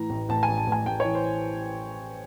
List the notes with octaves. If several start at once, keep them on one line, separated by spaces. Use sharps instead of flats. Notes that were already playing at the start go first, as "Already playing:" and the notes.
Already playing: A2 E3 A#5
A1
A1 A5
G#5
A1
A5
A1
G#5
A1 G5
E3 C#5
C5